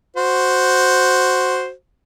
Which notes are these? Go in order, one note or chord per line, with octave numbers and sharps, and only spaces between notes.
F#4 C5